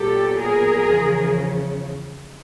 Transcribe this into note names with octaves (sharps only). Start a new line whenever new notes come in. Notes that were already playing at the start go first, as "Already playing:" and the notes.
Already playing: A#2 F#3 B3 G4 A4
G#4 A#4
E2 C#3 F3